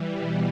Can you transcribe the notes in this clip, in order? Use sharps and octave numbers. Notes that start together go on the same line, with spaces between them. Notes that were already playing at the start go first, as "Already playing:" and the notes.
Already playing: E3 G3
B2